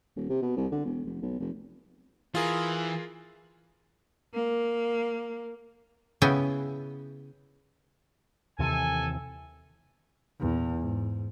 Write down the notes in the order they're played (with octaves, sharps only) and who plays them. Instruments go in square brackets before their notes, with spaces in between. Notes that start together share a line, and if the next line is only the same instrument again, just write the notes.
[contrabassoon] D#1
C3
B2
C2
D3
E1
F1
B1
F1
[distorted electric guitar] E3 [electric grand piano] F4 G#4 A#4
[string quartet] A#3
[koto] C#3 B3 E4 G5 G#5
[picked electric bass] D#2 C3 E3 [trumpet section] A4 G#5
[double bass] E2 A#2
G#2